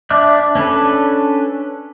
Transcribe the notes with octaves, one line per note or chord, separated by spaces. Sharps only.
D4 D5 E5 D6 F#6
C#4 D4 A4 B4